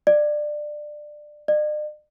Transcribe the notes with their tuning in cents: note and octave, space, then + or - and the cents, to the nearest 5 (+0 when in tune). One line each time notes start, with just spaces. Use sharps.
D5 +20
D5 +45